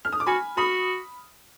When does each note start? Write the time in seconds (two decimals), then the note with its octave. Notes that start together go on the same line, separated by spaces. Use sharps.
0.05 F6
0.13 D#6
0.20 D6
0.26 F#4 G#5 B5
0.57 F#4 B5 D#6